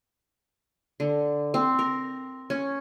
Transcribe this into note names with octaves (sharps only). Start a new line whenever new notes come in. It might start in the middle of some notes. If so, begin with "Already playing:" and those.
D3
C4
A#4
C#4